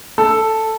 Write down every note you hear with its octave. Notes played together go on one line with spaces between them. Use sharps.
A4